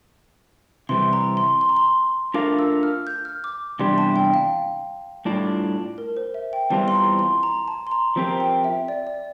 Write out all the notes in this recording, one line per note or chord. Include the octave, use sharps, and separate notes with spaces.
C3 E3 G3 C4 C6
A#5
C6
C6
A#5
C6
A3 D4 F4 A#4 F5 D6
E6
F6
G6
F6
D6
E2 C3 G3 D4 G4 C6
A5
G5
F5
A2 G3 D4 F4
A#4
C5
E5
G5
E2 E3 G3 C4 F4 A5
C6
A#5
C6
A#5
A5
C6
A#5
F3 C4 G4 A#4
G5
E5
D5
D5